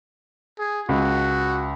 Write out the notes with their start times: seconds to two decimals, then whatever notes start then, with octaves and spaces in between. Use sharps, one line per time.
0.59 G#4
0.89 C#2 F#4